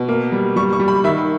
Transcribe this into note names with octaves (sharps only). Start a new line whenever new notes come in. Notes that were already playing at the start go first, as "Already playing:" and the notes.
Already playing: B2
A#3
G3
G3 C#6
C#6
G3
B5
D#3 E5